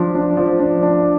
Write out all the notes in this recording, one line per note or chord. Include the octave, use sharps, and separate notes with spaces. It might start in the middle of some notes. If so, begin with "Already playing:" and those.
Already playing: F3 D4
D4
F3
D4
D4